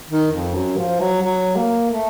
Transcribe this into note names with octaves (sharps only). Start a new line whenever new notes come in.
D#3
F2
F#2
F3
F#3
F#3
A#3
A3